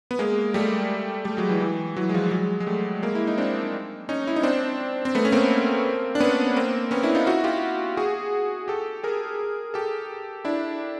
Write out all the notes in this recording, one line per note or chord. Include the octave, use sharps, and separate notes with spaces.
B3
G#3 A#3
G3 A3
G3 A3
F#3 G#3
E3
E3
E3 F#3
G#3
F3 G3
F#3 G#3
G#3
G3 A3
G#3 A#3
E4
D#4
C4 D4
C#4 D#4
E4
D#4
C4 D4
C4
A3 B3
C#4
A#3 C4
D4
B3 C#4
A#3 C4
B3 C#4
D4 E4
D#4 F4
E4 F#4
F4 G4
F#4 G#4
G4 A4
G#4 A#4
G4 A4
D4 E4